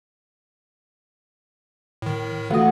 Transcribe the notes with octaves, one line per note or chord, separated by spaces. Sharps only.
A2 D#3
E3 A3 F4 F#4 F#5 D#6